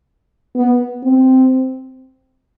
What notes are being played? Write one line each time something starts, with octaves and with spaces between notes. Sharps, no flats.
B3
C4